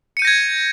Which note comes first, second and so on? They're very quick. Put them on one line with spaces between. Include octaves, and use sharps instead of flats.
C#7 D#7 G6 A#6 G#6